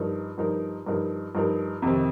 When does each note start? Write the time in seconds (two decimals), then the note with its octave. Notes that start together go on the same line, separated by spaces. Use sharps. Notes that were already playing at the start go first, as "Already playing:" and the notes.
Already playing: G2 F3 D#4 A#4
0.38 G2 F3 D#4 A#4
0.86 G2 F3 D#4 A#4
1.35 G2 F3 D#4 A#4
1.82 F2 C3 D#3 C4